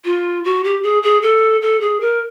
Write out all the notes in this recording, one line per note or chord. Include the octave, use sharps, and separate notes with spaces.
F4
F#4
G4
G#4
G#4
A4
A4
G#4
A#4